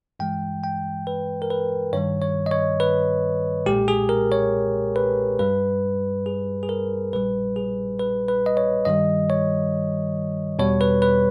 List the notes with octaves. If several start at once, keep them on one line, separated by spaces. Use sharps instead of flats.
G2 E3 G#3 G5
G5
B4
A#4
B4
G2 D#3 G3 C#5
C#5
D#5
C#5
B4
B1 A#2 G#3 G4
G#4
A#4
C#5
B4
G2 G3 B4
G#4
G#4
A#4
A#1 A#2 G3 B4
G#4
B4
B4
D#5
C#5
G2 D#3 G3 D#5
C#5
E2 B2 G3 C#5
B4
B4